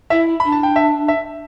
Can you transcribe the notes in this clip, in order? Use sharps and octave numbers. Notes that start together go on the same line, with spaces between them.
E4 E5
D4 B5
A5
G5
E5
E5